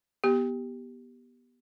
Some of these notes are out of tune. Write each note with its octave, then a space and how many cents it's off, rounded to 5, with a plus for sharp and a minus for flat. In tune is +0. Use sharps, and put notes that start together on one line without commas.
B3 -15 G4 +0